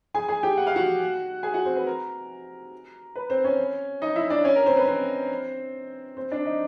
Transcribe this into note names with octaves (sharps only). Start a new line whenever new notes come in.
G#4 G#5
G#4 G#5
G4 G5
F#5
F5
F#4 F#5
G#4 G#5
F#4 F#5
C4 C5
B4
A#4
B4
C4 C5
C#4 C#5
D#4 D#5
E4 E5
D4 D5
C#4 C#5
A#4
C4 C5
B4
C4 C5
C4 C5
D4 D5
D#4 D#5